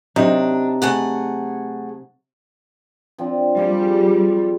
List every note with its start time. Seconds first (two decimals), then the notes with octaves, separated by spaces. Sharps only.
0.16 C3 F#3 D4 D#4
0.82 A3 G#4 F#5
3.18 F3 C4 D4
3.57 G3 F4 G#4